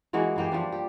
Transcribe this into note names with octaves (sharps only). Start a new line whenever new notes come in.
E3 G#3 A#3 F#4
E3 A#3 G4
F3 G3 D4
G4